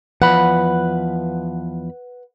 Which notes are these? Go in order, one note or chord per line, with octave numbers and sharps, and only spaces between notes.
E2 F3 B4 F#5 B5